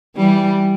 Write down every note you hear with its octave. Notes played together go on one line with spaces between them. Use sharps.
E3 G3